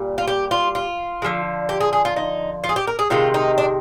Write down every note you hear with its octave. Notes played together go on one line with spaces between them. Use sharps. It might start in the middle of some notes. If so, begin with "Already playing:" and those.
Already playing: A#2 G3
F4
G4
F4
F4
D3 F3 G#3
G4
G#4
G#4
F4
D#4
F4
G#4
G4
A#4
G#4
C3 D#3 G#3 F4
D#4
D4